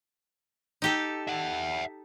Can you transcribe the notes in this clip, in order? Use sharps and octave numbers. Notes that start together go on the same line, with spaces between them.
D#4 G4 A4
E5 F#5